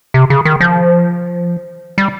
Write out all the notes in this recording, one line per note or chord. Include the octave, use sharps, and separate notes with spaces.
C3
C#3
D#3
F3
G3